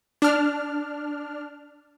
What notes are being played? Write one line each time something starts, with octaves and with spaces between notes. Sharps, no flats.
D4 F6